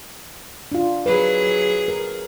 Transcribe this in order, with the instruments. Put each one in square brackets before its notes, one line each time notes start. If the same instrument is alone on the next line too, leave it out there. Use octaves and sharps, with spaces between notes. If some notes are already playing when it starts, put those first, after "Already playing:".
[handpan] D4 F4
[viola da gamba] F#3 G#4 [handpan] B4
[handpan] A#4